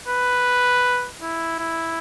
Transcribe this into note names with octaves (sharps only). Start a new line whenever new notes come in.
B4
E4
E4